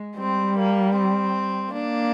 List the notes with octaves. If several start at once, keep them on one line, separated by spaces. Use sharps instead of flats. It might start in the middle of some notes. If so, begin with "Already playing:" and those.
Already playing: G#3
G3 C4
A#3
C4
A#3 D4